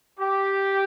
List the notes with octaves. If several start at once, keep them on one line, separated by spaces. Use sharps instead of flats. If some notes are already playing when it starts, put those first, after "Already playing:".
G4